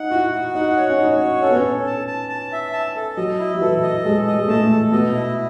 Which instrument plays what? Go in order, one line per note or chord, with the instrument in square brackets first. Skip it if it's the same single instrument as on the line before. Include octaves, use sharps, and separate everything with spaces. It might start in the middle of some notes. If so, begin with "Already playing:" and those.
Already playing: [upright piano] D#4 [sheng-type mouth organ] F#5
[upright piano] E4 [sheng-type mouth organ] F#4
[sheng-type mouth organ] F#4
[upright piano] D#4 [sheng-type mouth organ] F#5
[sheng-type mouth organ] C#5
[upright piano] C#4
[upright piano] D#4 [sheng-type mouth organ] F#4
[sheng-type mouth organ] C#5
[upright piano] C#4 [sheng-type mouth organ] A4
[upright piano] B3
C#4
[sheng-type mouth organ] A4
A5
A5
A5
E5
A5
A4
[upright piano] F#3 [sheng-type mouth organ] D#5
[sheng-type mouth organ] E4
[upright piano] F#3
[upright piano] E3 [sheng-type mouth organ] A4
[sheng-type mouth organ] D#5
[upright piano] G#3 [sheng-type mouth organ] A4
[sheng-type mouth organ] D#5
[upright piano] G#3
[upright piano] A3 [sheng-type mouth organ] A5
[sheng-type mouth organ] A4
[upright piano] B2 [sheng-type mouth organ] D#5
[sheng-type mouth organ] E4